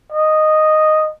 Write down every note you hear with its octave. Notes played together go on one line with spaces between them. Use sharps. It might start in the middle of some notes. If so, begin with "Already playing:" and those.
D#5